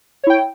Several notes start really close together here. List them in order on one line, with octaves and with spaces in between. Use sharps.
C#5 E4 G5